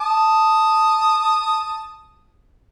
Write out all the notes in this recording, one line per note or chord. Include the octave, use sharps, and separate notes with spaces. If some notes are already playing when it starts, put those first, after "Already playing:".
A5 D#6